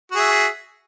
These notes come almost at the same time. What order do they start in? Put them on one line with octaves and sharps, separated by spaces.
F#4 G#4 E5